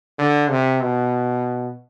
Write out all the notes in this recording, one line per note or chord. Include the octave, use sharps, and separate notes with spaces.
D3
C3
B2